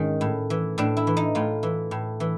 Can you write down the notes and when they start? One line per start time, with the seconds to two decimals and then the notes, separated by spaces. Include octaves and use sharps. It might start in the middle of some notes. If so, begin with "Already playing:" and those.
Already playing: G#2 D#3 G#3 C#4
0.21 A2
0.50 E3
0.78 A2 D4
0.97 E4
1.07 E3
1.17 D#4
1.35 A2 F4
1.63 E3
1.91 A2
2.20 E3